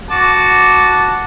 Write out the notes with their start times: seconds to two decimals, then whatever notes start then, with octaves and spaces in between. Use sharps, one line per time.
0.11 F#4 A5 D6